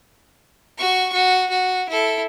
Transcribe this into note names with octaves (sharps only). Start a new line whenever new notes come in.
F#4 C#6
F#4
F#4
E4 A4